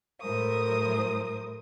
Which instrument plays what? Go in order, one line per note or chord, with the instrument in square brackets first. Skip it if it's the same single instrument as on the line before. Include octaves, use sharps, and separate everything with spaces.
[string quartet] A2 F#3 A#4 C5 D#6